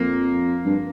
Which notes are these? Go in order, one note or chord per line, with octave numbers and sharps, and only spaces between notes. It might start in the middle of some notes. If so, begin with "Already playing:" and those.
Already playing: F2 A#3
G2